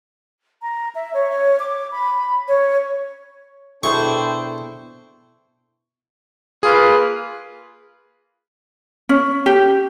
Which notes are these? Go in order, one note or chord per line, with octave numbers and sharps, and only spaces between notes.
A#5
E5
C#5
D6
B5
C#5
B2 D4 E4 G#4 A4 C5 G5 C#6
A#3 F4 G#4 B4
C#4
G4